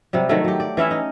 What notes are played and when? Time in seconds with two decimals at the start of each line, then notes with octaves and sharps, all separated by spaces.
0.13 C3 F#3 G3
0.29 D#3 F#3 A3
0.44 F#3 G4
0.60 D5
0.77 E3 C#4 E4 E5
0.91 D#4